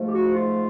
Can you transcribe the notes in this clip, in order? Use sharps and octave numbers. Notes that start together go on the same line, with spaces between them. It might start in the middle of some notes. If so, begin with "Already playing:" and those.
Already playing: G#2 F3 A3
G4
F#4
F4